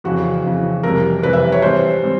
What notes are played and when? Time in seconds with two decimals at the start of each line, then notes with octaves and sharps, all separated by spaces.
0.04 F2 C#3 E3 F#4
0.44 F2 C#3 E3
0.83 F2 C3 E3 G3 A#4
1.22 F2 C3 E3 G3 B4
1.33 E5
1.52 C#5
1.62 E3 G3 C4 C5
2.02 E3 G3 C4